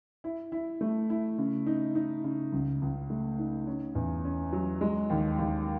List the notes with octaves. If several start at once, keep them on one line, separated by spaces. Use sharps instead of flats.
E4
E4
A3
E4
C#3
D#4
D#4
C#3
C#2
C#2
A3
D#4
C#4
E2
C#4
F#3
G#3
D#2
D#2